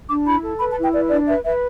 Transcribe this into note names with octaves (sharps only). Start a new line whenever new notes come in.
D4 D6
E4 B5
A4
B4 B5
A5
E4
G5
B4 D5
D4 D5
B4 E5
B4 E5